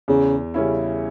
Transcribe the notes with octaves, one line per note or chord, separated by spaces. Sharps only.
E2 C#3
C#3 G3 C#4 E4